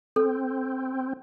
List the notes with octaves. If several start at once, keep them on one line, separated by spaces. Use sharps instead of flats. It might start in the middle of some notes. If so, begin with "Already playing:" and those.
C4 A4